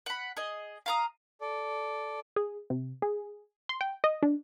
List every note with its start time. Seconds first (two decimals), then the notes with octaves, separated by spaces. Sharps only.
0.06 F#5 B5
0.37 G#4 D#5
0.86 F5 A#5 D#6
1.41 A4 D5
2.36 G#4
2.70 C3
3.02 G#4
3.69 C6
3.81 G5
4.04 D#5
4.22 D4